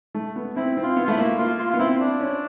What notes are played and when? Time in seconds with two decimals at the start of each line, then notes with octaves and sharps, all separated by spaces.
0.15 A3
0.36 B3
0.56 C4 E4
0.77 C4
0.83 F4
0.97 B3
1.05 F4
1.08 A3 E4
1.18 A#3
1.38 A#3 F4
1.59 F4
1.70 B3 F4
1.79 C4 E4
2.01 D4
2.20 C#4